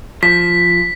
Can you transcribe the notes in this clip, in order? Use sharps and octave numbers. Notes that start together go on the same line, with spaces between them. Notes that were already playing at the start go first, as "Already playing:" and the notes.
F3 B6